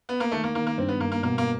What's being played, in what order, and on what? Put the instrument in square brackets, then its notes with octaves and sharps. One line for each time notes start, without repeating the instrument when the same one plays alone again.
[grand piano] B3
A#3
[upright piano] D#3 [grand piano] A3
[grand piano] A#3
[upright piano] D#3 [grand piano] A#3
[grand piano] A#3
[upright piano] G2 [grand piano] C4
[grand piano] B3
[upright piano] G2 [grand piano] A#3
[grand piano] A#3
[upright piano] B2 [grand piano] A#3
[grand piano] A#3